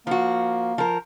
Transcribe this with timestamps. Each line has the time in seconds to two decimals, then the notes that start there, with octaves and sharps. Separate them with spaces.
0.07 F3 A#3 F#4
0.78 F3 A#4